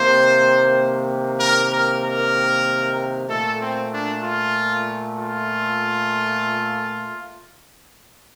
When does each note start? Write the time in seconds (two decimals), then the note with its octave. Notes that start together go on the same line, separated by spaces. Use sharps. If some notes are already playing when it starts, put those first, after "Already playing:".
Already playing: C3 D#3 A#3 C5
1.38 A#4
1.70 A#4
2.02 A#4
3.28 A#2 A3 A4
3.60 C4
3.91 D4
4.22 F4
5.18 F4